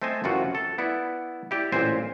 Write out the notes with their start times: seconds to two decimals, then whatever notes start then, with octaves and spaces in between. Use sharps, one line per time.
0.02 A3 C4 C5 D#5 G#5 A5
0.24 F#2 C3 E3 F4 F#4
0.55 A4
0.78 B3 E4 D5 E5
1.51 E4 G4 D5
1.72 A1 A#2 C4 C5 G#5